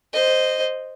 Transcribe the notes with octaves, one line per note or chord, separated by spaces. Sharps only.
C5 D#5